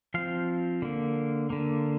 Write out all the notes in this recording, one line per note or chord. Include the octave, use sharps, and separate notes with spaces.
F3 C4 F5
D3 A#3
D3 A#3